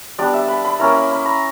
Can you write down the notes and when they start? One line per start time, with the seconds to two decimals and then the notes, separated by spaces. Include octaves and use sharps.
0.18 G3 B3 D4 D5
0.34 E5
0.48 B5
0.65 B5
0.79 A#3 C#4 E4 A#5
0.94 B5
1.11 B5
1.25 A#5